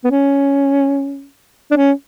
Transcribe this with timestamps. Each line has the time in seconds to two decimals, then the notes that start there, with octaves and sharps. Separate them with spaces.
0.04 B3
0.11 C#4
1.71 D4
1.77 C#4